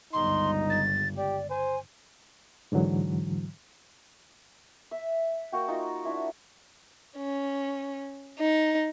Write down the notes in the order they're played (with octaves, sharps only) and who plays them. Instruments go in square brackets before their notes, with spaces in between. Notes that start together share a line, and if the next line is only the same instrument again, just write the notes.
[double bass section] G1 C#2 [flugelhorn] D#4 [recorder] C6
[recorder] A6
[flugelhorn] G4 [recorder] D5
[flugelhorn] C5 [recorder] G#5
[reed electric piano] G#2 D3 E3 F#3
[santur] E5
A#3 F#4 G5
D#4 F4 F#4 C6
D4 E4
[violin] C#4
D#4